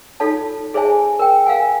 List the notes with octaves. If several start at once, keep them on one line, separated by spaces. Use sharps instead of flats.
D#4 F4 A4 C#5 A5
G#4 C5 C#5 E5 G#5 A5
A#4 G5
A#4 F5 F#5 G#5